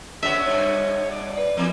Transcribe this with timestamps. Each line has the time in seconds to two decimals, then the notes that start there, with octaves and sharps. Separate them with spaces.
0.23 B3 C#4 D4 E5
0.46 G2 B2 C#5
1.11 D5
1.37 B4 D5
1.57 A#2 E3 F3 A#3 C4